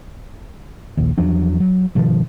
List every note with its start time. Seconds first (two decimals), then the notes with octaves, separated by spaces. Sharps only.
0.97 A#1 D#2
1.18 E2 F3 F#3 D4
1.60 F#3
1.95 G2 B2 D#3 F3